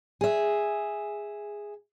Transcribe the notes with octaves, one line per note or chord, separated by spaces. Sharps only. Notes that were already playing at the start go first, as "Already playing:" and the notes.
G#4 E5